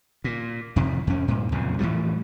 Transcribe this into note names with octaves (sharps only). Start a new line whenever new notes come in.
A#2
F2 C3 D#3 F3
F2 C#4
G2 A#2
B1 F2 A#2 C#3
A2 E3 F3 G3